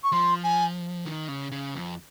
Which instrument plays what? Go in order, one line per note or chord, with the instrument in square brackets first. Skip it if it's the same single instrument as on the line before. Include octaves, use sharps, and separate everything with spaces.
[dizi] C#6
[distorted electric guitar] F3 [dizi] C6
[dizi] G#5
[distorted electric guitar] D#3
C#3
C#3
F2